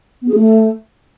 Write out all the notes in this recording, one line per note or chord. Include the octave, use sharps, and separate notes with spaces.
B3
G#4
A3